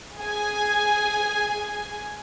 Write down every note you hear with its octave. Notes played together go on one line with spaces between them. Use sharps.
G#4 G#5